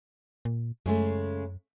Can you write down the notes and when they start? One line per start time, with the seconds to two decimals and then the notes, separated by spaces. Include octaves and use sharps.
0.45 A#2
0.86 F#2 C#3 G#3 A3